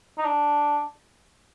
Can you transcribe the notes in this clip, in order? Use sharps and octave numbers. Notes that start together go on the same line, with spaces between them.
D#4
D4